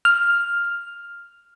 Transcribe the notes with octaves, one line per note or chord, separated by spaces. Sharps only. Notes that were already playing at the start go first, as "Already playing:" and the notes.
F6